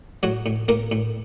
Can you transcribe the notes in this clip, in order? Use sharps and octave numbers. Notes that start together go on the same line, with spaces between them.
A2 F#3 F#4
A2
A2 A#3 A#4
A2